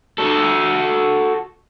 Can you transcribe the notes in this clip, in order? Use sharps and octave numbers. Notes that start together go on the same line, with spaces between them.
F#4 A4